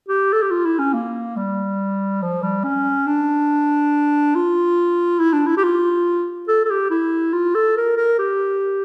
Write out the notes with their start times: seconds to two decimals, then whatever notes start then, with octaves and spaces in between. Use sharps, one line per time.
0.08 G4
0.33 A4
0.42 G4
0.51 F4
0.65 E4
0.79 C#4
0.94 A#3
1.37 G3
2.22 F3
2.43 G3
2.64 C#4
3.07 D4
4.35 F4
5.20 E4
5.33 D4
5.47 E4
5.57 G4
5.63 F4
6.48 A4
6.65 A4
6.70 G4
6.91 E4
7.33 F4
7.55 A4
7.77 A#4
7.97 A#4
8.19 G4